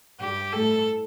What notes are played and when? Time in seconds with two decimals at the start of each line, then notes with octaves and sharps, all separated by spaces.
0.20 G2 G4
0.53 A2 A4